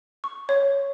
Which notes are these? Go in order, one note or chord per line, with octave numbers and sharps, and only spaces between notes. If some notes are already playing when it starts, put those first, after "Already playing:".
C#6
C#5